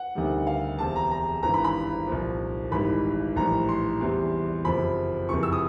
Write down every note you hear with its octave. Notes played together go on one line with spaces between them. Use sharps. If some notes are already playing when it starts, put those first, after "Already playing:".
Already playing: F#5
D2 C3 D#3 G3
F5
E1 E2 C3 A5
A#5
A#5
G#1 G2 E3 A#5
B5
B5
C2 A#2 F3
G#1 G#2 E3 G3 B5
A#1 A2 E3 G3 A#5
C6
E2 C3 E3 G3
F#1 F2 C3 F3 B5
F#1 F2 C3 E3 C#6
E6
D#6